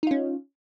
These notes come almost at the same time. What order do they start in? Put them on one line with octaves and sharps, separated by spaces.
D#4 F4 C#4